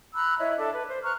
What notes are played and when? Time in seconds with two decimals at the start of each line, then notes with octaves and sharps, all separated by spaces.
0.15 A#5 B5 E6 F#6
0.39 E4 C#5 D#5 E5
0.57 D4 A4 E5
0.73 B4
0.87 C5
1.03 A#5 C#6 F6 F#6